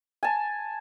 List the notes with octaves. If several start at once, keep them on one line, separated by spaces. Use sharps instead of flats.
G#5 A5